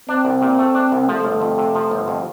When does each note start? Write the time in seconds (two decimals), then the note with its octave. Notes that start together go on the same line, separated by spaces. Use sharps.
0.09 C4 D4
0.25 C2
0.42 A#2
0.59 A3
0.75 D4
0.92 C2
1.09 F3 A3
1.25 G1
1.42 F2
1.58 C3
1.75 F3
1.91 G1
2.08 F2